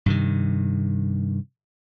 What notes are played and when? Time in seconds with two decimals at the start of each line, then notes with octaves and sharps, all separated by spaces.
0.06 G2 C3 D#3